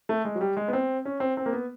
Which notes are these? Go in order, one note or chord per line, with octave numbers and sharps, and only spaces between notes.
A3
G#3
F#3
G3
G#3
B3
C4
C#4
C4
C4
A#3
B3